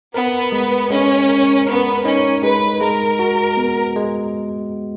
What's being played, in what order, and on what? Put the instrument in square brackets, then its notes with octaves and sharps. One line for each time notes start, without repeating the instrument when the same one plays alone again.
[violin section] B3 [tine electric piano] A#4
[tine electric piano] G#3
[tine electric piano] G#3 [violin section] C#4
[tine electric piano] A#4
[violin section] B3 [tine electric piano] A#4
[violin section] C#4 [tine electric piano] D#4
[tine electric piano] G#3 [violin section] B4
[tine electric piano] G#3 [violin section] A#4
[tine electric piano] F#4
B3
G#3